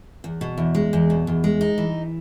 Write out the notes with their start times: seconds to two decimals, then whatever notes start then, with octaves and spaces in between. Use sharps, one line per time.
0.24 E2
0.41 B2
0.58 E2
0.75 G#3
0.93 E2
1.10 B2
1.27 E2
1.44 G#3
1.61 D#4
1.78 E3